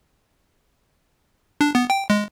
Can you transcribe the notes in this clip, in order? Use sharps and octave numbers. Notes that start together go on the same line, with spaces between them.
D4
B3
G5
G#3